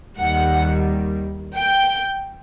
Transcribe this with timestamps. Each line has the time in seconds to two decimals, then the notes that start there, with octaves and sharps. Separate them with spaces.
0.17 D#2 D#3 G3 F#5
1.57 G5